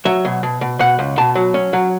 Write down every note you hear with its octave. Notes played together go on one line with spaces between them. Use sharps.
F#3 E5
B2
B2
B2
B2 F#5
C#2
B2 A5
F#3
C#4
F#3